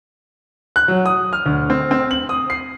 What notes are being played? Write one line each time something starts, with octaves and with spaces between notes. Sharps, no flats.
F#6
F#3
D#6
F6
D2
C4
C4
F#7
D#6
C7